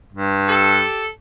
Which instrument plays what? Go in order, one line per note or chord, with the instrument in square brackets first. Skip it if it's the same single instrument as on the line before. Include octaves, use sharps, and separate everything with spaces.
[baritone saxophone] G2
[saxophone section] G4 A4